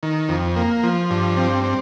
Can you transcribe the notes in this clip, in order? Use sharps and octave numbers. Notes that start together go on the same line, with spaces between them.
D#3
F2
A#3
F3
G2
C4
C4